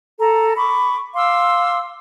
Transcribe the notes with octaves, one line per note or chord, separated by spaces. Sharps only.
A4 A#5
B5 C#6 D6
F5 C6 D6 E6